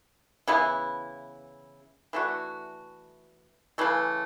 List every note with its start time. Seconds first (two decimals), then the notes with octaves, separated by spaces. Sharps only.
0.47 C#3 E3 B3 E4
2.13 E3 A3 D4 F#4
3.78 C#3 E3 A3